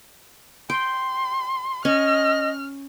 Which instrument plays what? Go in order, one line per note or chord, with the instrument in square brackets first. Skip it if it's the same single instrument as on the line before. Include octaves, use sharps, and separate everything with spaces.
[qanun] G5 [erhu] C6
[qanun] C#4 [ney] D#5 [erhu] F6